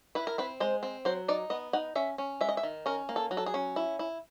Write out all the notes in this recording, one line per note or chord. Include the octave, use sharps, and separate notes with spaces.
E4 B4
A#4
C4 B4
G#3 C5
C4
F#3 C5
D#4 D5
B3 D#5
D#4 F#5
C#4 E5
C#4
G#3 E5
D#5
E5
D#3
C#4 A#4
A#3
A4
F#3
A4
G#4
C#4
E4
E4